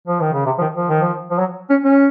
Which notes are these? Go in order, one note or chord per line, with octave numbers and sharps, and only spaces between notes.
F3
D#3
C#3
C3
F3
D#3
F3
D#3
F3
F3
F#3
C#4
C#4